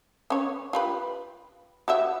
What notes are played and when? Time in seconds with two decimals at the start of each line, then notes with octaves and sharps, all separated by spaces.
0.30 C#4 C#5
0.73 F4 G4 B4
1.88 F#4 G4 E5